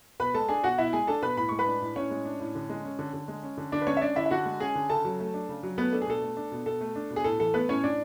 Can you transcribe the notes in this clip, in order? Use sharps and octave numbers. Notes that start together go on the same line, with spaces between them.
B2 B4 B5
G#3 A4 A5
D4 G#4 G#5
B2 F#4 F#5
B2 E4 E5
G#3 G#4 G#5
D4 A4 A5
B2 B4 B5
A2 B5
G#3 C#6
B4 B5
D4
A2
A2 C#4 C#5
G#3
D4
A2
D3
G#3
C#4
D3
D3
G#3
C#4
D3
D3 D4 D5
B4
G#3 C#4 C#5
E5
C#4 D4 D5
D3 E4 E5
E5
D3 F#4 F#5
G#3
C#4 G#4 G#5
D3
C#3 A4 A5
F#3
A3
D4
C#3
F#3
A3 B3 B4
D4 A4
G#4
B2 A4
A3
D4
B2
B2 A4
A3
D4
B2
G#4
A2 A4
E3 A4
A3 B3 B4
A2 C#4 C#5
A2 D4 D5